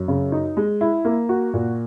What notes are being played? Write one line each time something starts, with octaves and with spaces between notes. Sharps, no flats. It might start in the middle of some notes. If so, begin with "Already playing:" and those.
Already playing: F#2
C#3
D#4
G#3
E4
A#3
F#4
A#2